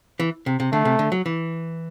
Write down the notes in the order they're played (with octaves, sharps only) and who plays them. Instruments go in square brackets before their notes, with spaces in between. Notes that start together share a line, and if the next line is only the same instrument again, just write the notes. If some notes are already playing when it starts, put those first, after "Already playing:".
[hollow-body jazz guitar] E3
C3
C3
[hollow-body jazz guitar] D3 [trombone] A3
[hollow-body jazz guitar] C3
D3
F#3
E3